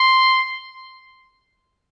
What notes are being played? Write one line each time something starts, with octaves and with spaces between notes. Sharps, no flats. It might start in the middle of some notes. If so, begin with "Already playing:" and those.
Already playing: C6